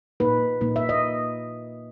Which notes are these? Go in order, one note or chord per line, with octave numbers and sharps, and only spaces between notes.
A#2 A#3 D#4 B4
A#2 A#3 D#4
E5
D#5